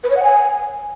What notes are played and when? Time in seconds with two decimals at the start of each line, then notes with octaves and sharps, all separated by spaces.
0.03 B4
0.10 C#5
0.16 F#5
0.23 G#5